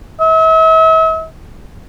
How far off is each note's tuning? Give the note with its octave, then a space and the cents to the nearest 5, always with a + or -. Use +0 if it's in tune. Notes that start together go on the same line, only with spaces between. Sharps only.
E5 -40